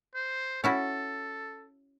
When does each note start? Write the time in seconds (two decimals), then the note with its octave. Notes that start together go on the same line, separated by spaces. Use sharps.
0.14 C5
0.64 C#4 E4 F#4 A4